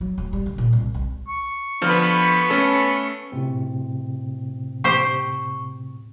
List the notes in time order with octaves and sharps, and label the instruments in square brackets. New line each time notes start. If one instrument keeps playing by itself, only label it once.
[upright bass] F#3
D1
G3
D3
A#2
C2
C2
[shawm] C#6
[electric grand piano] D3 F3 F6 [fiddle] B3 B4
[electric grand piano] A3 C#4 A4
[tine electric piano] A2 C3 C4
[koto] G4 C5 [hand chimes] C#6